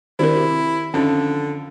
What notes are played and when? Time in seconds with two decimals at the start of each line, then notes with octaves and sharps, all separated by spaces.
0.19 D#3 G3 C4 D4 E4 A#4
0.36 C3
0.94 F2 D3 D#3 C#4 D#4